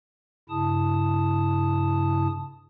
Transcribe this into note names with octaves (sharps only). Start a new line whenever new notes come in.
G2 C#3 E4 A5 D#6